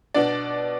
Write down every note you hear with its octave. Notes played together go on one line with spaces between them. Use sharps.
B2 B3 D4 D5